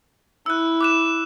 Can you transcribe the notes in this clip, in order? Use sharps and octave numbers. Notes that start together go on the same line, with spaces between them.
E4 E6 F#6
D6 F#6 E7